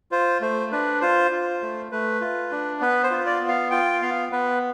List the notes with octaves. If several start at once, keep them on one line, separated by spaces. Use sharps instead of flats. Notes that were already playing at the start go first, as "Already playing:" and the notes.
F4 C5
A3 C5
D4 B4
F4 C5
F4
A3
A3 B4
F4
D4
B3 B4
C5
F4
D5
B3
F5
F4 G5
B3 F5
B3 B4